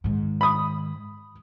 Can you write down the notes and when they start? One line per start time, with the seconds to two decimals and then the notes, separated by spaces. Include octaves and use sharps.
0.04 G#2 D#3
0.41 B5 D#6